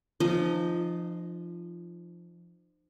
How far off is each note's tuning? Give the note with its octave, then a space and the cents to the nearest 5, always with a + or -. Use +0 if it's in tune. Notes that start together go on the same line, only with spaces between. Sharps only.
F3 -15 D#4 -45 D#5 +0